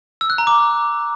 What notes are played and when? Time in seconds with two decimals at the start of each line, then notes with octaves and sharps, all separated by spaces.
0.21 E6
0.30 F#6
0.38 A#5
0.47 D6